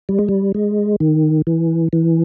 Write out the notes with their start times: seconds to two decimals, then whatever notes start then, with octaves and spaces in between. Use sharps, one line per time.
0.09 G3
0.19 G#3
0.29 G3
0.55 G#3
1.00 D#3
1.47 E3
1.93 E3